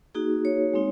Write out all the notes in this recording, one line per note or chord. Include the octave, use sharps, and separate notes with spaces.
A#3 D#4 F#4 G#4
C#5
G#3 C4 D#4